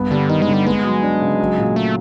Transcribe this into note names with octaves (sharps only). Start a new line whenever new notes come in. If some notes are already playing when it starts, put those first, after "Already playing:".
Already playing: G2 B3
D3 G3
D#3 D#4
G#3
D3
G3
G#3 B3
F#3
D4
C#3
F#3
A#2
A3